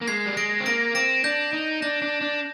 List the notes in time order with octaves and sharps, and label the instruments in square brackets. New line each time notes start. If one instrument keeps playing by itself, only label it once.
[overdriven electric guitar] A#3
[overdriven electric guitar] G#3 [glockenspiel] G#6 C7
[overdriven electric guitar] G3
[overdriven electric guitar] G#3 [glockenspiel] A#6 D7
[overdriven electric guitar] C4
[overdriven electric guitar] A#3 [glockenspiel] A#6 D7
[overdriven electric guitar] C4 [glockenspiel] A#6 D7
[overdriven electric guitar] D4 [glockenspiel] G6 A#6
[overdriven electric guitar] D#4
[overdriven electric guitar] D4 [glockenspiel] G6 A#6
[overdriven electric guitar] D4
D4